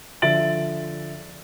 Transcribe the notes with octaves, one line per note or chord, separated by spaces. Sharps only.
D3 F3 E5 A6 D7 F#7